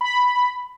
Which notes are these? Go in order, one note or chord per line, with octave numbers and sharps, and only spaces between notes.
B5